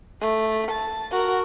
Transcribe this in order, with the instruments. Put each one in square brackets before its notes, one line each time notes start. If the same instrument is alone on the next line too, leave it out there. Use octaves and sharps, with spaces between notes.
[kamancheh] A3
A5
F#4 A#4